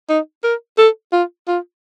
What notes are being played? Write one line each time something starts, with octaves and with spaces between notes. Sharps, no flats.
D#4
A#4
A4
F4
F4